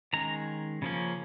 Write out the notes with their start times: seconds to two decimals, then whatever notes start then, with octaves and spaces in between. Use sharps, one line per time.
0.13 D#3 G#3 C#4 A#5
0.82 C#3 F3 A#3 C#4